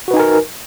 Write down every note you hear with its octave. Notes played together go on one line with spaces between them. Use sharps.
D#4 F#4 A#4 B4 G#5